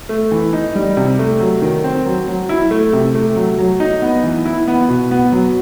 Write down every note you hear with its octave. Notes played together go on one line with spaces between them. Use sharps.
A3
E3
D#4
G3
C3
A3
F#3
D#3
C4
F#3
F#3
E4
A3
C3
A3
F#3
F#3
D#4
B3
E3
E4
B3
B2
B3
F#3